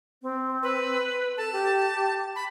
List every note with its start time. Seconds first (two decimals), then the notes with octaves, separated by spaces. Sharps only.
0.22 C4
0.63 B4
1.38 A4 A5
1.53 G4
2.36 B5